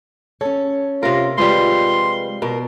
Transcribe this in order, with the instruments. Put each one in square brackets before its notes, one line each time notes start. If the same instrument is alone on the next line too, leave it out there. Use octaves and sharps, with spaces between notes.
[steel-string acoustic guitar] C#4 C#5 [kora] A4
[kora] C3 A#4 [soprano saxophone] F4
[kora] F3 G3 [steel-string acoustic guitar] G#3 B4 [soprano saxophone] C6
[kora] B2 [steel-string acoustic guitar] A#4